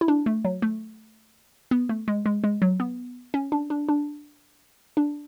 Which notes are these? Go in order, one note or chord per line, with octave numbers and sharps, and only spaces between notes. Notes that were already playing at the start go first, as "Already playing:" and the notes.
E4
D4
A3
F#3
A3
B3
A3
G#3
G#3
G#3
F#3
B3
C#4
D4
D4
D4
D4